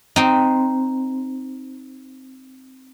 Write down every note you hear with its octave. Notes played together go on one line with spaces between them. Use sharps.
C4 D#4